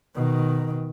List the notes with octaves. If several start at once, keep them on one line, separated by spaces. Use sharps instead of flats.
B2 D#3